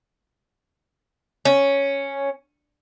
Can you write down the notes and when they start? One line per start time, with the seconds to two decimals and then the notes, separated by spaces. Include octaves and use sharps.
1.45 C#4